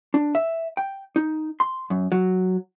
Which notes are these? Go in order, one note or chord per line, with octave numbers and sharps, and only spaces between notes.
D4
E5
G5
D#4
C6
F#2
F#3